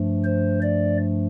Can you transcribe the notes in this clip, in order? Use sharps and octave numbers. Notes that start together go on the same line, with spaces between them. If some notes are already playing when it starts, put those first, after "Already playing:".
Already playing: G2 F3 A3
C5
D5